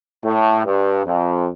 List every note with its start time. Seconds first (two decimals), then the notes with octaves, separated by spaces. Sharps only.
0.24 A2
0.64 G2
1.05 F2